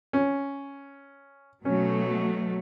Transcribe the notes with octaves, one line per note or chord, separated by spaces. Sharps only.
C#4
B2 F#3 A3 C#4